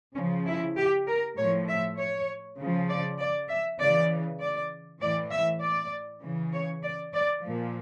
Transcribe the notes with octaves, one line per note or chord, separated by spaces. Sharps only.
C#3 F3 C#4
E4
G4
A#4
A2 F3 C#5
E5
C#5
C#3 F3
D5
D5
E5
C#3 E3 D5
D5
A2 E3 D5
E5
D5
C#3 E3
C#5
D5
D5
A#2 F3